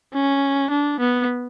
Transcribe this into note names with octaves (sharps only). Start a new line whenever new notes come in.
C#4
D4
B3